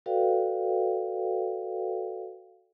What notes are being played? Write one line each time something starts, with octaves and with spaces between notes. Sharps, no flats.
F#4 A4 B4 D5 F5 G5